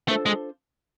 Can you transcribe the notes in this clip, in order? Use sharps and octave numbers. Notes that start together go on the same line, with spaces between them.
A3 D4 F4 A4 C5
G#3